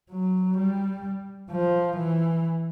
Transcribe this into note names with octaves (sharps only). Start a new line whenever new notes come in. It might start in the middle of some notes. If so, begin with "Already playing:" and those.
F#3
G3
F3
E3